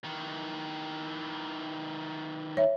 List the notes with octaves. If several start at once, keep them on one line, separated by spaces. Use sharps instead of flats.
D#3 E3
C#5 E5